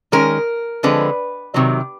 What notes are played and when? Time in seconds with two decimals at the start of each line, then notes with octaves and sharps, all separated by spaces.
0.12 D#3 G#3 C#4 A#4
0.83 D3 F3 G#3 C4 B4
1.54 C3 D#3 F#3